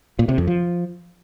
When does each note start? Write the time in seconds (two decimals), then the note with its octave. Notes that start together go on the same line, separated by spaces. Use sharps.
0.19 A#2
0.29 C3
0.38 F2
0.47 F3